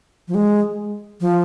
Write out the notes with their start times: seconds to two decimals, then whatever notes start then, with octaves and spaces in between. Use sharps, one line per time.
0.28 F3
0.34 G#3
1.21 F3